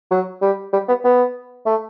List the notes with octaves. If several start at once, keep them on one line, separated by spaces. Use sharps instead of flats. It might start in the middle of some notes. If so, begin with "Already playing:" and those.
F#3
G3
G3
B3
B3
A3